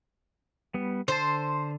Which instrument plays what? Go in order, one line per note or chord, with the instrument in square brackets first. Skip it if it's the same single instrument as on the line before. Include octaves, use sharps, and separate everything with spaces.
[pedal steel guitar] G3 B3
[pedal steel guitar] D3 A5 [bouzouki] C5